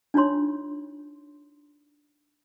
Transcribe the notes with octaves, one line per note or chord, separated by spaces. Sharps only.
D4 D#4 F4 C#5 C6